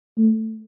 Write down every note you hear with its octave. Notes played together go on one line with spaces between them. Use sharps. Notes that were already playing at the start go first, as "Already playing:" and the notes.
A3